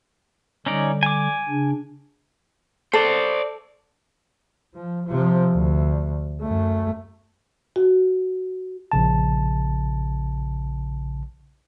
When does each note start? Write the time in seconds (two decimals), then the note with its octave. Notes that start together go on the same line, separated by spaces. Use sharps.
0.66 D3 G3 C#4 D#4 D5
1.03 G#5 D6
1.49 C#3 D4
2.93 A4 C5 D5
4.75 F3
5.07 C3 F3
5.55 D2
6.42 F#2 A3
7.76 F#4
8.92 A#1 C#3 A5